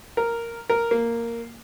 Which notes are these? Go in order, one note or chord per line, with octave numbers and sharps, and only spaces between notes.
A#4
A#4
A#3